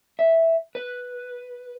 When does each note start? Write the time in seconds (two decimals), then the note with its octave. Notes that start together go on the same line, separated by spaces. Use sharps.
0.19 E5
0.75 B4